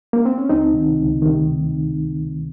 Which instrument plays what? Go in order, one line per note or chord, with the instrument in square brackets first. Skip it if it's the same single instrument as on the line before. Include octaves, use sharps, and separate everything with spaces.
[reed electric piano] A#3
C4
C#4
C#2 C4 D#4
C3 D#3
C#2
C3 D#3